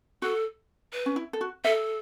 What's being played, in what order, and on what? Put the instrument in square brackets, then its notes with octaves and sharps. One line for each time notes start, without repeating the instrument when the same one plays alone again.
[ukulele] F#4 [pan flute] A4
[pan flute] B4
[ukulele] C#4
E4
A4
F#4
[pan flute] A4 [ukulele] E5